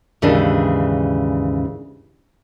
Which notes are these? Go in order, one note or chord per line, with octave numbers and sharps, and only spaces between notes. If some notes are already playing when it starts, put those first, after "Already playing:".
D#2 G#2 C#3 E3 D4